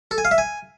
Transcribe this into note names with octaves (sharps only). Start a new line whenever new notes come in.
A4
G#5
F5
E5
G#5